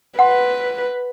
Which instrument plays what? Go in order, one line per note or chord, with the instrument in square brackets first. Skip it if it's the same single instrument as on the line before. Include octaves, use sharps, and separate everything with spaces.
[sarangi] B4 [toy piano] F#5 C6